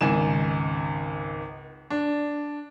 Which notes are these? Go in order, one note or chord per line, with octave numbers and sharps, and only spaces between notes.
G#1 C#2 G#5 E7
D4